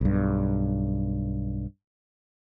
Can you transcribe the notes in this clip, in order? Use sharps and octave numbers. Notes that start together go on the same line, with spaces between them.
B1 G2